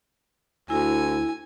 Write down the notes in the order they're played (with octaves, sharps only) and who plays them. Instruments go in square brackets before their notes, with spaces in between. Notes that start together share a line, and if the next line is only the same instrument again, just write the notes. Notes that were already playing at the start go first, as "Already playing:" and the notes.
[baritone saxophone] D2 [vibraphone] E4 [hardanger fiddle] G#5